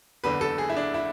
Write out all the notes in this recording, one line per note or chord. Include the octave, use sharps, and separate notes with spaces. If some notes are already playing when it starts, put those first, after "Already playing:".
F#1 E2 D3 B4
A4
G#4
E4
D4
E4